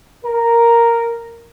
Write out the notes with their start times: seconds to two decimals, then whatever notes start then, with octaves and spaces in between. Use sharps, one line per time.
0.24 A#4